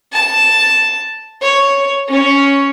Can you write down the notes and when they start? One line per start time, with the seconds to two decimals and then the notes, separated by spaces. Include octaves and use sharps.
0.13 A5
1.42 C#5
2.08 C#4 C#5